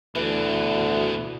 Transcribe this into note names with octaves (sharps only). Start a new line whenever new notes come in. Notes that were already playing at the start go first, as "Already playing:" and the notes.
D2 B2 E3 D4